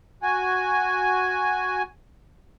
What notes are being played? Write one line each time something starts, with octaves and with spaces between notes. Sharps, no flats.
F#4 G#5